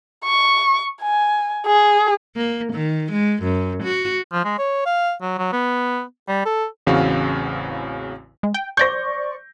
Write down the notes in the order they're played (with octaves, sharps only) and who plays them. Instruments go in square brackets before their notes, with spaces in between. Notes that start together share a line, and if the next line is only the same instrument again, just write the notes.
[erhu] C#6
G#5
G#4
[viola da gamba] A#3
D#3
G#3
F#2
F#4
[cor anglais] F3
G#3
C#5
F5
F#3
F#3
B3
G3
A4
[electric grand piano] A1 E2 C#3 C4 F#4 F5
[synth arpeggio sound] G#3
G5
[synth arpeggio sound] C5 D5 C#6 [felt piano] G6 A#6